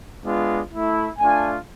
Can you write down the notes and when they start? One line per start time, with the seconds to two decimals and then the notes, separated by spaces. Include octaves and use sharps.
0.23 G#3 B3 D4 F4
0.71 A3 E4
1.18 A3 D4 F4 G#5